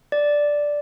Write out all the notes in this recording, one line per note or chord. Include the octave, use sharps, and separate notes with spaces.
D5